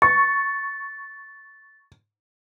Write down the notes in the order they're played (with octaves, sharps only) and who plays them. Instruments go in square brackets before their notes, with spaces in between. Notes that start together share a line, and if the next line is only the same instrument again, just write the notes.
[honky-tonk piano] C#6 [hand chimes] A6